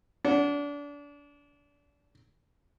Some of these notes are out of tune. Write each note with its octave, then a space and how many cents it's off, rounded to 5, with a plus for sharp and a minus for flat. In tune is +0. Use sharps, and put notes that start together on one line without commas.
D4 -30 F#5 +0